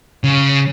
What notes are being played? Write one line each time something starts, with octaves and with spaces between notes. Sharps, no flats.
C#3